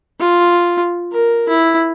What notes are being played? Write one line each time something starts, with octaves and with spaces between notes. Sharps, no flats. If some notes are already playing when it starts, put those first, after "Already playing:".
F4
A#4
E4